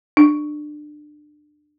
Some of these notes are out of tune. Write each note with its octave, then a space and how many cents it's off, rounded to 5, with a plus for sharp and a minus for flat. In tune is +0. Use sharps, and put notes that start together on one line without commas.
D4 +25